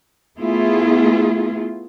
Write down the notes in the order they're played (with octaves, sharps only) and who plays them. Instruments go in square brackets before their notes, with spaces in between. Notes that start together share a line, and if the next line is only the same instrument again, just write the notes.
[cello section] A3 B3 E4 F4 G#4